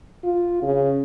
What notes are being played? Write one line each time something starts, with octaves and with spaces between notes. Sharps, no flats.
F4
C#3